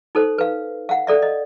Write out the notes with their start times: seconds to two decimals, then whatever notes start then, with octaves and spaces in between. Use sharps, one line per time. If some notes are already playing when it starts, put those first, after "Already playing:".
0.15 D#4 A4 C5
0.38 B4 F5
0.89 F5 F#5
1.07 A4 D5 E5
1.22 D#5